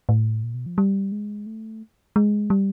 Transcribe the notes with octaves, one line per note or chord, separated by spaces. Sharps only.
A2
A#2
B2
F3
G3
G#3
A3
G#3
G3